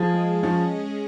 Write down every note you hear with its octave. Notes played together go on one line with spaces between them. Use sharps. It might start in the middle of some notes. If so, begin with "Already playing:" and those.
Already playing: F3 G#4
G#3
F3 C#4